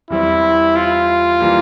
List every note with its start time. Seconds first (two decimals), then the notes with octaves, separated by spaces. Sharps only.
0.10 E2 E3 G3 C4 E4
0.76 F4
1.40 E3 G3 A#3